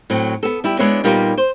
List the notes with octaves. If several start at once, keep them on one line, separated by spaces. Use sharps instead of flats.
A2 F#3 C4
B3 A4
G3 E4 G4
G#3 B3 D4 E4 G#4 C#5
A#2 G3 A#3 B3 D#4 F4
C5